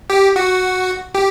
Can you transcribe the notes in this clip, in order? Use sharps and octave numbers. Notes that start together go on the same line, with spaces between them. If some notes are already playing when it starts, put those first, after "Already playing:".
G4
F#4
G4